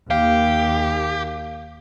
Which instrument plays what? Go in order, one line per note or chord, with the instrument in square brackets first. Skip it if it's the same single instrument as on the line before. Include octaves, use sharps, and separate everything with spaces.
[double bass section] D#2 [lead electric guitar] G4 [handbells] F5